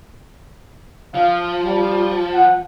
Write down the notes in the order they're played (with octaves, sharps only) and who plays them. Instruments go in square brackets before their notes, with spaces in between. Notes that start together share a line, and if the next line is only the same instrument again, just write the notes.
[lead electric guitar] F3 [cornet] F5
[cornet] G3
F#5